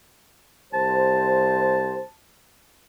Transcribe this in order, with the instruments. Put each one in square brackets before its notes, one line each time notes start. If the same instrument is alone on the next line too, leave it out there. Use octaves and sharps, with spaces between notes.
[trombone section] C2 G4 C5 [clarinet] A5